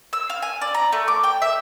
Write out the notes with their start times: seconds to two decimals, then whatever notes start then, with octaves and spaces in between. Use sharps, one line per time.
0.13 E6
0.30 F5
0.42 G#5
0.61 D5
0.74 A#5
0.92 A3
1.08 D6
1.23 G5
1.42 E5